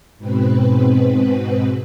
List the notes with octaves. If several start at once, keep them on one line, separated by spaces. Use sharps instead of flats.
G#2 B2 C4 B4